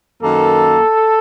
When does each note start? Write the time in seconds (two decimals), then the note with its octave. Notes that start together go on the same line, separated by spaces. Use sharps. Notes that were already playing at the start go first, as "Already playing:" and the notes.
0.22 F#2 D#3 A#3 A4